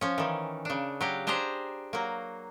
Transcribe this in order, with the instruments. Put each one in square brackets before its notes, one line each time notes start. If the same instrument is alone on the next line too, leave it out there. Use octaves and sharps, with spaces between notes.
[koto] F3 C#4
D#3 E3
C#3 D4
F#3 G4 F5
D4 G4 G#4 C5 A#5
F#3 A#3